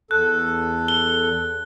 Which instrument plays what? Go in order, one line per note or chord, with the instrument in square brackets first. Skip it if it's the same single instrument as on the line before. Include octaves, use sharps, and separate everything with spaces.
[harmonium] E2 A4 [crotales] F#6
[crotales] G7